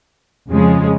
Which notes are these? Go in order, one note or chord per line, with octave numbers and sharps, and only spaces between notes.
F2 C#3 F3 G#3